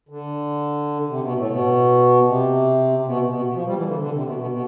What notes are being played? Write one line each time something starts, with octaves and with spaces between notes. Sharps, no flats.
D3
C3
B2
A2
B2
C3
C3
B2
B2
B2
F3
G3
E3
D3
D3
C3
B2
B2
B2